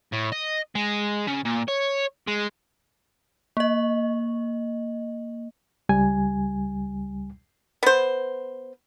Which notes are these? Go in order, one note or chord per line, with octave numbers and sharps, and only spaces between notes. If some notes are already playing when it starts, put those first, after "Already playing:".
A2
D#5
G#3
C#3
A#2
C#5
G#3
A#3 D#5
C#2 G3 G#5
B3 C5